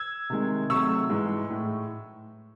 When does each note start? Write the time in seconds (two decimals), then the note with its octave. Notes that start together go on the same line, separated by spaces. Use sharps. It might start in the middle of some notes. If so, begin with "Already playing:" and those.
Already playing: E6 G#6
0.30 C3 D#3 G#3
0.70 C3 F#3 A3 C#6 E6
1.09 G#2 E3 G#3
1.50 A2